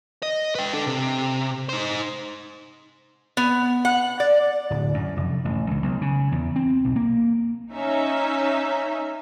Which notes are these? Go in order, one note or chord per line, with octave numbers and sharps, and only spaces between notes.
D#5
B4 G5
D4 A4
C3
D#4 C5
B3
F#5
D5
D1
F#2
F1
A1
C#2
B1
C#3
E2
C4
B1
A#3
C#4 D#4 E5